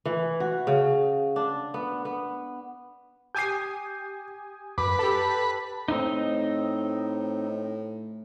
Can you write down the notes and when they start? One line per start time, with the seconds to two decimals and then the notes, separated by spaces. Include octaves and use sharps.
0.05 E3
0.40 F#4
0.67 C#3
1.36 D4
1.74 B3
2.05 B3
3.35 G4 G#5 D#6 G6 C7
4.78 F#2 B4 D6
4.99 G4 A4 A5
5.88 A2 C4 D#4